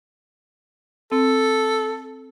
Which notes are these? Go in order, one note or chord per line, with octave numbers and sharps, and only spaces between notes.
C4 A4